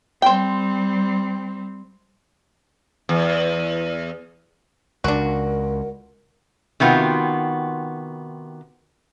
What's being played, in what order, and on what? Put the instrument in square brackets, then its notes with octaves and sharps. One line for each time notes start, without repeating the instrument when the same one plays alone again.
[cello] G3 C4 [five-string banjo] C5 G5
[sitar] E2
[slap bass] C#2 [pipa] D4 F#4 [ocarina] A#4
[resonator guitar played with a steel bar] C3 D#3 B3 F4 F#4